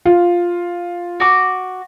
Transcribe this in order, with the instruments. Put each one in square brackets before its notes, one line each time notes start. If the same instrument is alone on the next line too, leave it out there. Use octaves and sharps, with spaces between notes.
[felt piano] F4
[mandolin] F#4 D6